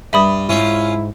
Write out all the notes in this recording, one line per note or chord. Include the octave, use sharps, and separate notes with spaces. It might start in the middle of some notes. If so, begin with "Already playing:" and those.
G2 E5 B5 D#6
G#2 C#4 E4 F4